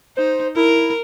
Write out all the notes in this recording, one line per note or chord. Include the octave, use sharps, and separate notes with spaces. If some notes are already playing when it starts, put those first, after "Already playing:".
D#4 C5
E4 A#4